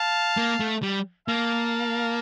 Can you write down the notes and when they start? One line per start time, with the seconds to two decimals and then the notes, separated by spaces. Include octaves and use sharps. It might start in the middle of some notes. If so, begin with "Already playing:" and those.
Already playing: F5 A5
0.37 A#3
0.60 A3
0.82 G3
1.28 A#3 F5 A5